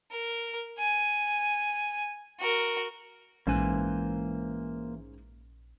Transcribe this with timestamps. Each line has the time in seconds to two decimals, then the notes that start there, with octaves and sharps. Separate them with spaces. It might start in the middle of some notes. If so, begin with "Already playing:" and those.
0.11 A#4
0.79 G#5
2.40 F#4 A#4
3.47 A#1 G#2 E3 A#3 C#4 C5 G#5